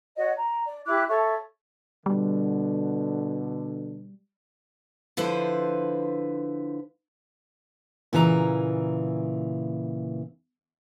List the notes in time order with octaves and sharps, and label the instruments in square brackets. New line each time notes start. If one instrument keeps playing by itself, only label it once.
[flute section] F#4 C#5 D#5 F#5
A#5
D5
E4 G4 D6 F#6
A4 C#5 E5 C#6
[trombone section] B2 D3 [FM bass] G3
[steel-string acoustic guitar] D3 F3 E4 B4 C5
A#2 C#3 E3 C#5 A#5